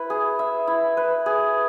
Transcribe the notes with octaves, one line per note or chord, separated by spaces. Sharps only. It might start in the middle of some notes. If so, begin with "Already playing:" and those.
Already playing: E4 B4
G#4
E5
E4
B4
G#4